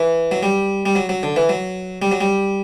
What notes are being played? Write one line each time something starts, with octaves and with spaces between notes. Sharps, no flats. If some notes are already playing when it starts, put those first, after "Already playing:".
Already playing: E3
F#3
G3
G3
F#3
F#3
D3
E3
F#3
G3
F#3
G3